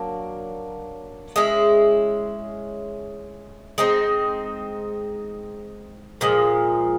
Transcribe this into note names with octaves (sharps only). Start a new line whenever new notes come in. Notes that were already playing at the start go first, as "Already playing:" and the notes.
Already playing: F#3 A#3 D4
G#3 C#4 E4
G#3 C4 D#4
A#2 F3 G#3